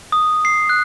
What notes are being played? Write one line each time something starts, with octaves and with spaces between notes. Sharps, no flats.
D#6
C7
F#6